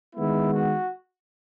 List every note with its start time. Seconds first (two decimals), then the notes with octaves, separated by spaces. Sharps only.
0.15 D#3 G#3 B3 E4
0.52 F#4